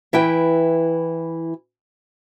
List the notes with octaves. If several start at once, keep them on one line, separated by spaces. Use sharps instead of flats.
E3 E4 B4 G5